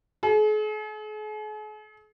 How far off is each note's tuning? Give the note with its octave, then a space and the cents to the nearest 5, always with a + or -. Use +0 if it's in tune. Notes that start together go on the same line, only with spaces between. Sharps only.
G#4 +45